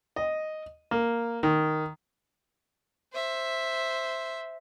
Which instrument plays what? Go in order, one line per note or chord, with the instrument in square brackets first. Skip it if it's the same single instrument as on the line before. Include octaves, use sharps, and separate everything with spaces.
[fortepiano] D#5
A#3
D#3
[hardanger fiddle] C5 E5